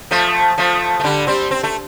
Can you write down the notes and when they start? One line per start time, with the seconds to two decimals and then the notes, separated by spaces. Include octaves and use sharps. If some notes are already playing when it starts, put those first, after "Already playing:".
0.11 F3 A3
0.58 F3 A3
1.00 A3
1.04 D3 G3
1.27 G3 C4
1.51 C4
1.63 A3